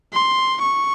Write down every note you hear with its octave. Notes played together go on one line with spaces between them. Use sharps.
C6
C#6